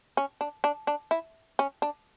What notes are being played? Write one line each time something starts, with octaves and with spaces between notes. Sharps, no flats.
C#4
D4
D4
D4
E4
C#4
D4